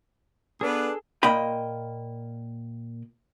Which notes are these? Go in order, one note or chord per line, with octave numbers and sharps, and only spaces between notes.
B3 D4 G#4 A4 B4
A#2 A#3 D#5 G5 B5